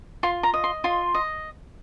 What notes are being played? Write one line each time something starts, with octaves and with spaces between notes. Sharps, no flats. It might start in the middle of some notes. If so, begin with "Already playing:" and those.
F4 C6
A#5
D#5
C6
F4 C6
D#5